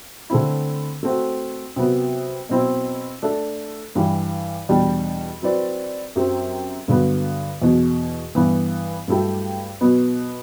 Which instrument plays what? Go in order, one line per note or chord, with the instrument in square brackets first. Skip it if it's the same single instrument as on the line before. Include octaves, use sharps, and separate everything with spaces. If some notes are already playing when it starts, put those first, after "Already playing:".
[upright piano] D3 A3 C4 E4
A3 C4 F#4
C3 F#3 B3 F#4
B2 F#3 C4 E4
A3 D4 A4 E5
G2 E3 G3
E2 B2 G3 D4 G4
F#3 C4 E4 B4 D5
F#2 F#3 C4 G4
G2 D3 F#3 B3
E2 B2 F#3
G2 E3 B3
G2 F#3 A3 E4 G4
B2 F#3 B3